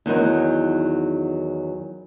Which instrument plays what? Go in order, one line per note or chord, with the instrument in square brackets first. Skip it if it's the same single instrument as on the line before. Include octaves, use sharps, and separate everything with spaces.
[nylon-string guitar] E2 D#3 F#3 D#4